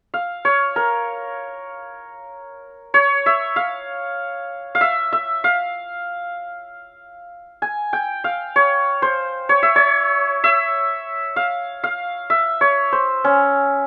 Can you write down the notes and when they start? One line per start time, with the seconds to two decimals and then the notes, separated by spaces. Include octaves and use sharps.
0.14 F5
0.45 C#5
0.76 A#4
2.94 C#5
3.26 E5
3.56 F5
4.75 F5
4.81 E5
5.13 E5
5.44 F5
7.62 G#5
7.93 G5
8.24 F5
8.56 C#5
9.02 C5
9.49 C#5
9.63 E5
9.76 C#5
10.44 E5
11.36 F5
11.84 F5
12.30 E5
12.61 C#5
12.92 C5
13.24 C#4